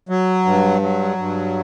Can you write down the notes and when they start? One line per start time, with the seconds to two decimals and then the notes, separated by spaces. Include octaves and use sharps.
0.09 F#3
0.45 G2
0.82 F#3
1.18 G2